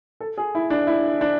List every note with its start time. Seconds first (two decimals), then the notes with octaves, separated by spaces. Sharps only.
0.20 A4
0.38 G#4
0.55 E4
0.70 D4
0.87 E4
1.21 D4